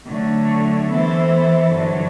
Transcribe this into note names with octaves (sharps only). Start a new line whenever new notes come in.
D3 F#3 A3
E3 B3 E4 A4 C5
G2 D3 F#3